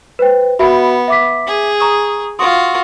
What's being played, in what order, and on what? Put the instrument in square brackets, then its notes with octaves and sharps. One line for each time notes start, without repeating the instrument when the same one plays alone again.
[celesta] B4 C5 G5
[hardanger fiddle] B3 [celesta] F#4 E5 B5
[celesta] E5 D6 B6
[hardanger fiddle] G#4
[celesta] A#5 C#6 D#6
[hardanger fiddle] F4 F#4 [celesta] C6 D#6